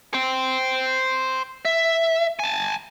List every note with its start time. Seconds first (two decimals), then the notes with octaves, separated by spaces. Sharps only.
0.14 C5 G5
1.65 E5
2.39 G#5 A5